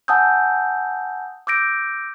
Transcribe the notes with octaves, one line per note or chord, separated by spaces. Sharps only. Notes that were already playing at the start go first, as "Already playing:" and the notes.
F#5 G#5 A5 D#6 E6 G6
D6 E6 G6 A#6 D7